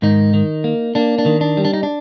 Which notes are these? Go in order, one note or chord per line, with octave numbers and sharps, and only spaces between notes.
G#2 D#3 D#4
D#3
A#3
A#3 D4
D4
D#3
D4
G3
D4
D#4
D4